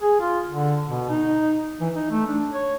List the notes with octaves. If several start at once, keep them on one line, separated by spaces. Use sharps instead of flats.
G#4
F4
D3
B2
D#4
E3
D#4
A3
D4
C#5